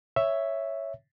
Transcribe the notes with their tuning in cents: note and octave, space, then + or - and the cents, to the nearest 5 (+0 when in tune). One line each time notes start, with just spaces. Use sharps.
C#5 +0 E5 +0